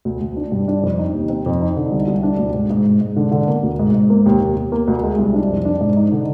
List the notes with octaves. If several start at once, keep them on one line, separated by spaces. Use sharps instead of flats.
D2
D2
D4
G2
D4
F2
D#4
D#2
C4
F2
D#4
D3
C2
C2
D4
D2
G#2
G#2
G#2
G#2
D3
D3
A#3
D2
G#2
G#2
A#3
D#2
D#2
D#2
A#3
D2
G#3
C2
D4
F2
D4
G#2
D#4
D3